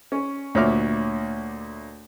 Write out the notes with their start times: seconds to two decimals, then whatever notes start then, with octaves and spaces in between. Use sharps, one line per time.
0.12 C#4
0.55 D2 A#2 C#5 E5 D6 F6